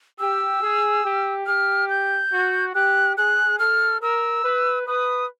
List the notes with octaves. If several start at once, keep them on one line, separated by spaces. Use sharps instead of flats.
G4 E6
G#4
G4
G4 F6
G6
F#4
G4 F#6
G#4 F#6
A4 F6
A#4 E6
B4
B4 D#6